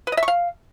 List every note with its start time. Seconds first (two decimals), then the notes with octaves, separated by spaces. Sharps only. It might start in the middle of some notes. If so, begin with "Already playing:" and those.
0.07 B4
0.12 D#5
0.17 E5
0.23 C#6
0.28 F5